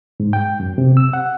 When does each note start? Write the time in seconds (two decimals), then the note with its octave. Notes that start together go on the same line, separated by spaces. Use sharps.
0.20 G#2
0.33 G5
0.60 F#2
0.78 C3
0.97 E6
1.13 F#5